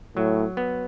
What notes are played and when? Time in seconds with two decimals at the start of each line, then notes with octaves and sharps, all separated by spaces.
0.16 A2 F#3
0.57 B3